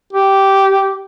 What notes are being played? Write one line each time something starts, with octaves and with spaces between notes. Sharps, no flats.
G4